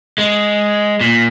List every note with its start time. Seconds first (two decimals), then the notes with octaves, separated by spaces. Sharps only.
0.18 G#3
1.01 A#2